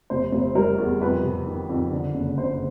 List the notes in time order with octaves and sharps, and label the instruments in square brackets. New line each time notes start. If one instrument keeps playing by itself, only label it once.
[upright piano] F1 C5
F1
G3 A#4
E2
F2 B4
C3
D#3
F2
D3
F#1
F#1 C5